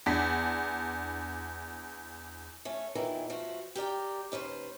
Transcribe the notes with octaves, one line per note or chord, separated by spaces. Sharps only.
E2 D4 B6
A3 C#4
E2 A#2 D#3 E3
F3 A3 F#4
G4 A#4 D5 G5
D#2 C#4 B4 C5